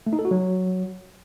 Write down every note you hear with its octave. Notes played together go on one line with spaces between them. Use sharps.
A3
D#4
A4
F#4
F#3